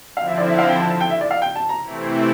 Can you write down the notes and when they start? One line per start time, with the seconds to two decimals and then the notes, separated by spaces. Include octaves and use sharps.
0.17 D3 F3 C4 E4 F5
0.28 E5
0.38 D5
0.49 E5
0.58 F5
0.68 G5
0.79 A5
0.90 A5
1.00 G5
1.10 E5
1.21 D5
1.31 F5
1.42 G5
1.55 A5
1.69 A#5
1.83 C3 E3 A3 C4 E4